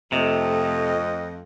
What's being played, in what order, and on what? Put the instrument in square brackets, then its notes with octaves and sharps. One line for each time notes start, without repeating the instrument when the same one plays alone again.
[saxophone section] F2 [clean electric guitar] C3 [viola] A3 [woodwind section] D#5